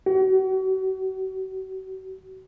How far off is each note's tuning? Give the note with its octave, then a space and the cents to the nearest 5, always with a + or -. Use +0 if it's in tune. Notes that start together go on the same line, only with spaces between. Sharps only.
F#4 +40